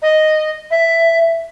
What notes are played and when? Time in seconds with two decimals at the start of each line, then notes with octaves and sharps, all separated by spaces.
0.02 D#5
0.70 E5